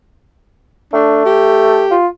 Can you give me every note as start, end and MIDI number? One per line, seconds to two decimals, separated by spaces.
0.93 1.84 57
0.93 1.25 62
1.25 1.97 67
1.91 2.07 65